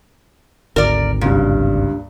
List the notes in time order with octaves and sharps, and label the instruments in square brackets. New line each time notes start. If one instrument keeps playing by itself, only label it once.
[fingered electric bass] G#1 D2 [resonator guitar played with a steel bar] A#4 D5
[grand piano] C#2 G2 [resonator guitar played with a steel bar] A#2